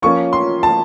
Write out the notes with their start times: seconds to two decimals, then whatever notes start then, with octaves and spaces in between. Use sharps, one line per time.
0.02 F3 A#3 C#4 C#6
0.33 C6
0.63 A5